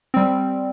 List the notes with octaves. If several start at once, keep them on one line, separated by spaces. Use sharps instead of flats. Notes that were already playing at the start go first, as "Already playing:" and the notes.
G3 C4